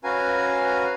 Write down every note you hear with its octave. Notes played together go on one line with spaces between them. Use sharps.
C#4 F#4 B4 F5 G#5 A#5